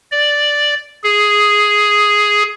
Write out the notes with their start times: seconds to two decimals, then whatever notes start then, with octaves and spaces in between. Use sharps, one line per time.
0.12 D5
1.04 G#4